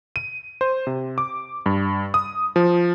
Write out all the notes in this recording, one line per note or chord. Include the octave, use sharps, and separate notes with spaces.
D#7
C5
C3
D6
G2
D#6
F3